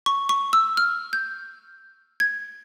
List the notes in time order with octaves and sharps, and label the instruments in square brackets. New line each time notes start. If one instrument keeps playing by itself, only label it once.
[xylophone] C#6
C#6
E6
F6
G6
G#6